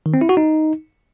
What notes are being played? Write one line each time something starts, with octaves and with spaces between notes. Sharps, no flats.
D#3
C4
E4
F#4
D#4